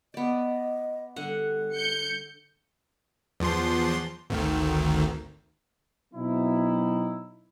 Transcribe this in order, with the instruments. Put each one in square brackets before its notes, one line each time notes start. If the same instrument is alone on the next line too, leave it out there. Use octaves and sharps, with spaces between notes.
[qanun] B3 D5 [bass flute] D#5
[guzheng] D3 [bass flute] G3 [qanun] F#5
[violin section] G6 C#7
[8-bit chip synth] E2 F3 C6
G#1 D2 D#3
[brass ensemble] B2 F#3 B3 C4 D#4 E4